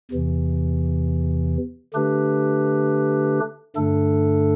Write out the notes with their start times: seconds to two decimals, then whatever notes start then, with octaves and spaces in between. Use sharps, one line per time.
0.11 E2 C3 E3
1.94 D3 A3 D4 G4 B4
3.76 G2 D3 A3 D4 A4